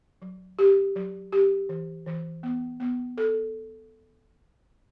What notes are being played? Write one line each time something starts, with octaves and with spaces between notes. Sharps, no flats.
F#3
G4
F#3
G4
E3
E3
B3
B3
A4